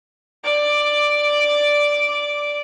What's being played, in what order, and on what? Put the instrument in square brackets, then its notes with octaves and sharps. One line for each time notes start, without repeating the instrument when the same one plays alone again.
[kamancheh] D5 D6